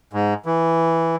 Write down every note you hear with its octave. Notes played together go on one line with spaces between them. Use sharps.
G#2
E3